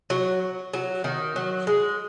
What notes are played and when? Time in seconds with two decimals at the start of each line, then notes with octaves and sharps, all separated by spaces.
0.10 F#3
0.74 F#3
1.04 D#3
1.36 F#3
1.67 G#3